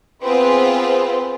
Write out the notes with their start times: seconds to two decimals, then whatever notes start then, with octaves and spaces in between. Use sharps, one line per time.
0.22 B3 C4 F4 G#4 B4